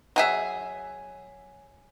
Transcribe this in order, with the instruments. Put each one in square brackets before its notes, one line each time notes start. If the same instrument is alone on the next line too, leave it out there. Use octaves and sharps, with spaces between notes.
[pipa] F#3 G#4 E5